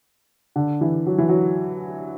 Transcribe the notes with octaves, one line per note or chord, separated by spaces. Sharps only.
D3
E3
F#3
E3
F#3